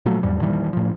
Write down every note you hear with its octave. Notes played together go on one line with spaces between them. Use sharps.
A#2 F3 F#3 A3
E2 G#2 G3
A#2 D#3 E3 G3
A2 F3